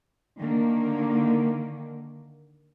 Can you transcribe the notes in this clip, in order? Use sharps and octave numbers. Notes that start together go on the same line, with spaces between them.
D3 D#3 A#3